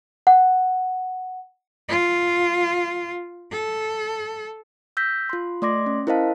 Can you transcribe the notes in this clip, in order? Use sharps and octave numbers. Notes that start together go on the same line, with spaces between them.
F#5
F4
A4
E6 G6 A#6 B6
F4 C6
A3 D5 C6 D6 A#6
C#4
E4 A#4 C5 D#5 F5 A5